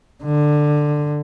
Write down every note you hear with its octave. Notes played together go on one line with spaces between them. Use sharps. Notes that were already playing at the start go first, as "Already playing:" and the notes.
D3